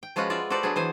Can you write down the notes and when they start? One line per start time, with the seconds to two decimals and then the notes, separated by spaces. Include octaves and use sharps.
0.03 G5
0.16 F3 G#3 C#4 F4 F#4 B4
0.30 F4 D5 E5
0.50 F#4 A4 B4 C5 D5
0.63 F#3 B3 D4 G#4
0.76 E3 C5 G#5